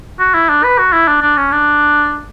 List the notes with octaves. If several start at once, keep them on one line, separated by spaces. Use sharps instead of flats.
F#4
E4
D4
B4
F#4
E4
D4
D4
C#4
D4